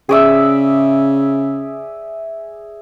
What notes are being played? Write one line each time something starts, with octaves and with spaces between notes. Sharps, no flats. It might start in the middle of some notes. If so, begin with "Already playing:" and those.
C#3 G#4 D5 E5